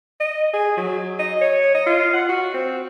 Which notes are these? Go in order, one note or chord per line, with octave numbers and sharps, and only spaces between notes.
D#5
G#4
F#3
D#5
C#5
D#5
F4
F#5
F#4
C4